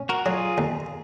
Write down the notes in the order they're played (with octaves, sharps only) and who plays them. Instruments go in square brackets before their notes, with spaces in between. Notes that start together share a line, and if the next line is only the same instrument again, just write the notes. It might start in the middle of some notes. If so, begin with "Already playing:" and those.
Already playing: [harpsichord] C#4
[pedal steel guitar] F#4 A#4
[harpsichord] F#3 [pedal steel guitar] F4 G#4
[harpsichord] D#2